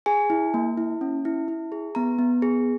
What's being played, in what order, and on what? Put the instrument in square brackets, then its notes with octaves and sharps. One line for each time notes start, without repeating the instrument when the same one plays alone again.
[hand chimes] G#4 G#5
E4
A#3
E4
C#4
E4
E4
G#4
B3 A#5
B3
G#4